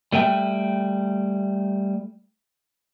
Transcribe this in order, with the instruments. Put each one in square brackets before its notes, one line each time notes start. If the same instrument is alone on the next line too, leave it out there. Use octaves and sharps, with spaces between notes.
[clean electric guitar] G3 A3 E5 G5